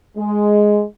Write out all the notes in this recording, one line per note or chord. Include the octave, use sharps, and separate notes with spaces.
G#3